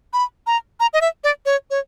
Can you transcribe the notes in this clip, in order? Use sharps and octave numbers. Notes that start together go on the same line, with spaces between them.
B5
A#5
A#5
D#5
E5
D5
C#5
C#5